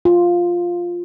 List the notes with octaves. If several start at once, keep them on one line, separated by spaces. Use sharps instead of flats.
F4